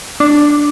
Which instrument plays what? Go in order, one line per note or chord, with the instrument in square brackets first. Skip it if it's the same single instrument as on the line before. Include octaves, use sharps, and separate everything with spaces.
[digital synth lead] D4